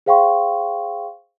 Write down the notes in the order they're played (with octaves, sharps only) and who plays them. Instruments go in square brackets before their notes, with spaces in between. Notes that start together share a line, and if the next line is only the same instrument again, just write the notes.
[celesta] G#4 C5 F5 G5 C6 C#6